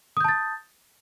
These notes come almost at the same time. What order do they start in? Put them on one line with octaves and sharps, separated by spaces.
D#6 G6 A5 A6